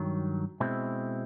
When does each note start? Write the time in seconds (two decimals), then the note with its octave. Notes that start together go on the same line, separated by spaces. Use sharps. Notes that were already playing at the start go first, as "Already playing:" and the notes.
Already playing: G2 D#3 F#3
0.60 B2 G#3 C4 E4